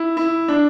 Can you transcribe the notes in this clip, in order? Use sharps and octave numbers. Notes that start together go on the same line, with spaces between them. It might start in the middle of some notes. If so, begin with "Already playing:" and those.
Already playing: E4
E4
D4